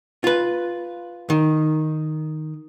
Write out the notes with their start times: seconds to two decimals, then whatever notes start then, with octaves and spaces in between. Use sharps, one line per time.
0.24 F4 B4
1.30 D#3